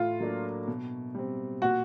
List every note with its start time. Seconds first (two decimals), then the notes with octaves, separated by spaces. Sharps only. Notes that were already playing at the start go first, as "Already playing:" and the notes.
Already playing: A2 F4
0.20 F#3 A#3 D4
0.68 B2
1.15 G3 C4
1.62 A#2 F#4